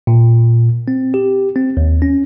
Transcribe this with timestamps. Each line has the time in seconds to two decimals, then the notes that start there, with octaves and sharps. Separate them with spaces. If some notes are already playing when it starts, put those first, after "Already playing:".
0.07 A#2
0.88 C4
1.14 G4
1.56 C4
1.77 D#2
2.02 C#4